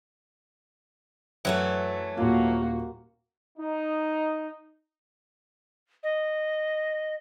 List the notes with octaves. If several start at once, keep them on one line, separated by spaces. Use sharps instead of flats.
F#2 E3 F#3 A3
D#1 A#3 F4 F#4
D#4
D#5